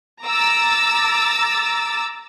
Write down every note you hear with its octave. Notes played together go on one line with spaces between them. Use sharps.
A#5 D6 E6 A6